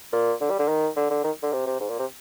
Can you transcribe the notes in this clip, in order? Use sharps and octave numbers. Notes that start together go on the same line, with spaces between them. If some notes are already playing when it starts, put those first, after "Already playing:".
A#2
D3
G3
D3
D#3
D3
D3
D#3
D3
C3
C3
G#2
A#2
C3